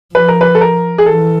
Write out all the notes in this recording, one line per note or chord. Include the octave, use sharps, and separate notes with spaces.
F3 B4
A#4
B4
A4
A#4
G#4
E3 A4